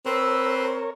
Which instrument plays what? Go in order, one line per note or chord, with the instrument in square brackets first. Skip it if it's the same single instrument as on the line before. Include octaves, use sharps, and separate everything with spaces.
[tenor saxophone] C4 [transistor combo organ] A#4 C#5 [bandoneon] B4 C6 [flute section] E6